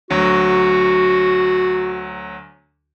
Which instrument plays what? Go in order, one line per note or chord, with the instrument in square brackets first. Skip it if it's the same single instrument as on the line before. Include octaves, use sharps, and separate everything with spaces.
[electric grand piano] D2 F#3 [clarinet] F#4